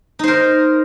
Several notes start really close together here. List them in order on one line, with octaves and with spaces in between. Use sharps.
D#4 C5 A#4